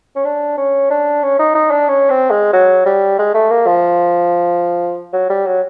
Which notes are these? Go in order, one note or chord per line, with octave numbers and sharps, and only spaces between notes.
C#4
D4
C#4
D4
C#4
D#4
D#4
D4
C#4
C4
G#3
F#3
G3
G#3
A3
A#3
F3
F#3
G3
F#3